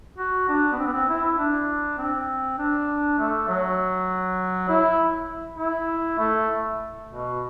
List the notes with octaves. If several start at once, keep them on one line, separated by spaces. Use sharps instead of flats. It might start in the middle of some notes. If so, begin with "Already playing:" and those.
F#4
D4
B3
C4
B3
C4
E4
D4
C4
D4
A3
F#3
E4
E4
A3
B2